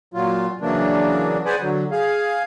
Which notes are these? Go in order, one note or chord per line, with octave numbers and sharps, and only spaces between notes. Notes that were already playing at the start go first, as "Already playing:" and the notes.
A#2 F#3 F4
C#3 E3 F#3 A#3 D4
G#4 B4 C5 D5 F#5 G#5
D3 F#3
G#4 F5